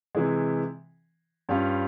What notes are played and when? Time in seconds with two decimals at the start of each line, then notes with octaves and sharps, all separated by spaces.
0.15 C3 E3 G#3
1.49 G2 G3 C#4 F4